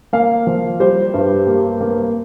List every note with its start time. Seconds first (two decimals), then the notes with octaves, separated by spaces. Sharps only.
0.13 A#3 F5
0.47 F3
0.80 G3 C5
1.14 G2
1.47 A#3
1.81 A#3